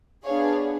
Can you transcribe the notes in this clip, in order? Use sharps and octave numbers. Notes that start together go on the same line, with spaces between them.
B3 D4 G#4 C#5 F5